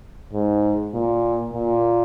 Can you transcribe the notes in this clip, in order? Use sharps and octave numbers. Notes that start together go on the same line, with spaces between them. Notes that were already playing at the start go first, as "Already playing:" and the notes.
G#2
A#2
A#2